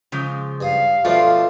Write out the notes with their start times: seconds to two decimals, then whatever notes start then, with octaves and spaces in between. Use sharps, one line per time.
0.12 C#3 F3 G#3
0.61 G2 F5 D#6
1.05 B2 F3 A3 D4 F4 C5 D5